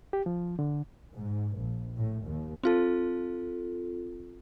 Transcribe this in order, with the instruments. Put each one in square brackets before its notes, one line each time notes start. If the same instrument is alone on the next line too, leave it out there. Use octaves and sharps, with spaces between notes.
[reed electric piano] G4
F3
D3
[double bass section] G#2
A#1
A2
D#2
[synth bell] C4 F4 A4